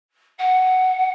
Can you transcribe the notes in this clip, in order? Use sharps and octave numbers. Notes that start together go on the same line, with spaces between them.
F#5